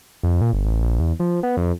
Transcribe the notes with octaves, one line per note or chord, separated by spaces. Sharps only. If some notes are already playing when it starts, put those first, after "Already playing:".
F2
A#2
G1
A1
A#1
E2
F3
B3
F2